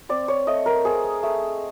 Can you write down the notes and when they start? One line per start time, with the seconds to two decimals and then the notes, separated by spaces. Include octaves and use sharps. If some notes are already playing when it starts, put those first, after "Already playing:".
0.09 C4 D5
0.28 C#5
0.47 A3 D#5
0.66 A#4
0.85 C4 G#4
1.23 A3